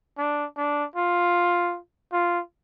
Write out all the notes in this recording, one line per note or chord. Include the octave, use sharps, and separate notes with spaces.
D4
D4
F4
F4